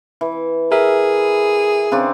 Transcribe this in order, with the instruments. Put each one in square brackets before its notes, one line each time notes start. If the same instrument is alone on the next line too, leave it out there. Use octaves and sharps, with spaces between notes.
[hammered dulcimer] E3
[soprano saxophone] G#4 [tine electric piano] A#4 E5
[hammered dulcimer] C#3 C4 D4